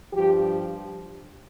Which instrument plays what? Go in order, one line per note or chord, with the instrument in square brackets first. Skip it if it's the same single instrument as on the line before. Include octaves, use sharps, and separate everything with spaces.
[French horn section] G2 F3 G4